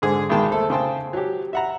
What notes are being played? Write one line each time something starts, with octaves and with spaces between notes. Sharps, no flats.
G#2 D3 G#4
B1 D#3 G#3 G5 A5
A3 A4 C5
C#3 C5 G5 A5
F#3 G4
E5 F#5 A#5